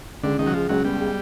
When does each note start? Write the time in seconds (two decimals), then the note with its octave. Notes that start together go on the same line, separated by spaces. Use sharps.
0.23 C#2 D3
0.39 C#2 D#3
0.46 F#3
0.54 F3 G#3
0.69 C#2 F#3
0.85 G3 B3
0.99 G#3